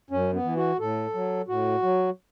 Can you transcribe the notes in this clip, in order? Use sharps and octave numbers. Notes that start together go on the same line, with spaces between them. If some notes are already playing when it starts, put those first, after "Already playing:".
F#2 C#4
B3
E3
F#4
A2 A4
F#3
A2 F#4
F#3